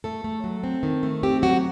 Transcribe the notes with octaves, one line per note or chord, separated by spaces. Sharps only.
A3 A4
A3
F#3
C4
D#3
A3
C4 G4
F#3 F#4